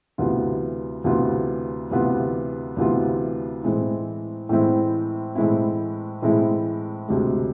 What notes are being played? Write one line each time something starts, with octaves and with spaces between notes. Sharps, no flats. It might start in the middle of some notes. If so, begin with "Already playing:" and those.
D2 C3 E3 B3 F4
D2 C3 E3 B3 F4
D2 C3 E3 B3 F4
D2 C3 E3 B3 F4
A2 E3 G#3 C4 E4
A2 E3 G#3 C4 E4
A2 E3 G#3 C4 E4
A2 E3 G#3 C4 E4
D2 C3 G#3